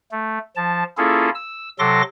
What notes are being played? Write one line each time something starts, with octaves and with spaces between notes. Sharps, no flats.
A3
F3 A5
A#3 C#4 E4 F4 G#4 A4
E6
C3 F#3 A4 C6 D6 A#6